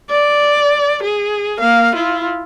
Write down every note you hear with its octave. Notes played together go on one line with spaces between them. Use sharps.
D5
G#4
A#3 F5
E4 F4